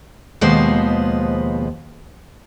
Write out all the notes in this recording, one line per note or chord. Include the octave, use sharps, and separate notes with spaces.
D#2 B2 F3 G#3 B3 C5